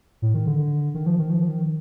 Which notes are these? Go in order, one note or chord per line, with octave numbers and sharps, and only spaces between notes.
A2
D#3
D3
D#3
F3
D#3
F3
D#3